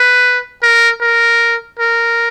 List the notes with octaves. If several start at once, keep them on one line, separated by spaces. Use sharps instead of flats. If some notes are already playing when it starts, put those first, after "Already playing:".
Already playing: B4
A#4
A#4
A#4